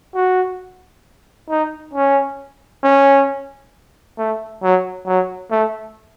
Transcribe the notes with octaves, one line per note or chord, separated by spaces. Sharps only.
F#4
D#4
C#4
C#4
A3
F#3
F#3
A3